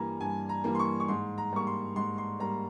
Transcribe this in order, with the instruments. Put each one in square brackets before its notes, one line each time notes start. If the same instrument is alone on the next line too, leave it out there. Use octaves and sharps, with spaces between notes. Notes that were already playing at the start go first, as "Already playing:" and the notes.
Already playing: [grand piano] G2 E3 G3 A#3 G#5 A#5
G2 G#5
A#5
E3 G3 A#3
C6
C#6
C#6
G#2 C6
A#5
G3 A#3 C#6
C6
G#2 C6
C6
G3 A#3 A#5